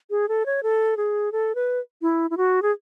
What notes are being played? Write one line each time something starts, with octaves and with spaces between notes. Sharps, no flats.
G#4
A4
C#5
A4
G#4
A4
B4
E4
E4
F#4
G#4